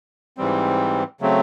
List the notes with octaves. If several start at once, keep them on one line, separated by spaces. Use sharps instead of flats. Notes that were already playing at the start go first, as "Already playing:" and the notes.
G#2 E3 G3 C4
C#3 F#3 A3 C4